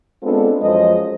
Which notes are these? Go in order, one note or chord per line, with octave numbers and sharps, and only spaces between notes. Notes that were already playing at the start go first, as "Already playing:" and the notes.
G#3 B3 C4 D4 F4 A4
F#2 F3 G#3 C5 D#5